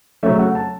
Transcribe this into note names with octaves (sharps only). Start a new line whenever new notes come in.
C#3 F#3 A3 C#4 E5
F#5
A5